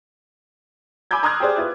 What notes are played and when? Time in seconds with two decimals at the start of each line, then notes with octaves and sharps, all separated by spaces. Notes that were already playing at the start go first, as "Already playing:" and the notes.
1.11 G#5 B5 D6 E6 G6 G#6
1.23 A#5 C6 D#6 F6 F#6 G#6
1.40 G4 G#4 C5 D5
1.56 E4 F4 B4